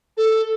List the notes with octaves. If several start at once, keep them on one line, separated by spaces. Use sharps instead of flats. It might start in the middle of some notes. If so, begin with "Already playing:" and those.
A4